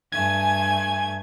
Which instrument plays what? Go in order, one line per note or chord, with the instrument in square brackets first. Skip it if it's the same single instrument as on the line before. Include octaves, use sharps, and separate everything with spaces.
[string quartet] G2 A3 G#6 [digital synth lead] G#5